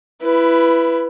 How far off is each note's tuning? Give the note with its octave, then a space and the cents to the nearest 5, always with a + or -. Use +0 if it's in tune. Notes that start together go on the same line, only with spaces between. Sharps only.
E4 +20 B4 +0